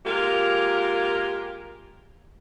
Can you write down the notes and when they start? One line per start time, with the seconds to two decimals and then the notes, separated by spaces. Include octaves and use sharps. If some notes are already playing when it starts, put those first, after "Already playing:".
0.06 G#3 A#3 F4 G4 A#4